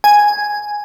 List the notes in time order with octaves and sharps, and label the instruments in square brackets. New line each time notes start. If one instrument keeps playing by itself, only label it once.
[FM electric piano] G#5